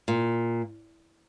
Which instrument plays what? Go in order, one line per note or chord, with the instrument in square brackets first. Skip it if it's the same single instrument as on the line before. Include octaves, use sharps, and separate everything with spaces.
[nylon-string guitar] A#2